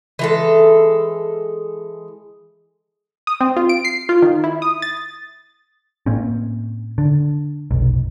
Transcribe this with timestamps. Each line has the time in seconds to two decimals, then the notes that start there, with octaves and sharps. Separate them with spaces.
0.19 E3 G#3 A4
3.27 D#6
3.41 C4
3.56 F4
3.69 D7
3.85 C7
4.09 F4
4.22 D#3
4.44 E4
4.62 D#6
4.82 A6
6.06 A2 A#3 C4 C#4
6.98 D3
7.71 F1 B1